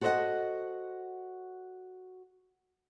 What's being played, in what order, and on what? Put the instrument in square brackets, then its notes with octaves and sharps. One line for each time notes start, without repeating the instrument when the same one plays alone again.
[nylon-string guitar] F#4 A4 C5 D5 D#5 F#5